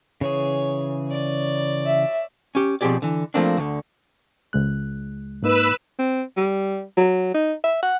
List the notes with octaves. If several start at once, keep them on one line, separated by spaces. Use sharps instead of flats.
C#3 E3 G#4 C#5
C#5 D5
E5
C#4 G4
B2 F3 C4 G4 G#4 D5
D3 E3
F3 A3 A#3 C4 D4
D2 D3
C#2 G#3 F#6
G#2 A#3 D#4 B4 E6
C4
G3
F#3
D#4
E5
F#5